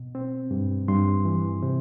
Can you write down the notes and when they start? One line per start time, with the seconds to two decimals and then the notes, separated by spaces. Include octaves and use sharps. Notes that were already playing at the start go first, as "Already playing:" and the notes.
Already playing: B2
0.15 C4
0.51 G2
0.88 G2 C6
1.25 E3
1.62 C3